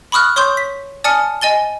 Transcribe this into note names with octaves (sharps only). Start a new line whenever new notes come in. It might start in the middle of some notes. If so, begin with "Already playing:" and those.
B5 C#6 D#6 F6 F#6
C#5 C6 C#6 D#6 G6
B6
D5 G#5 A5 D#6 F6 C#7
D#5 G#5 A6 G7